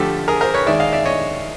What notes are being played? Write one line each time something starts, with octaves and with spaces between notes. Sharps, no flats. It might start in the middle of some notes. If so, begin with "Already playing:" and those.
Already playing: D3 F3 A3 G4 A4
G#4 A#4
A#4 C5
B4 C#5
D#3 G#3 D5 E5
D#5 F5
D5 E5
C#5 D#5